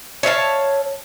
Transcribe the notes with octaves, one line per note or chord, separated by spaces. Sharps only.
C#5 E5 F5 A5